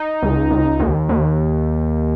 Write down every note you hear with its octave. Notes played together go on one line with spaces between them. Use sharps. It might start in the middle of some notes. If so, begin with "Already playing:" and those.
Already playing: D#4
C#2
C#2
D#2
D#2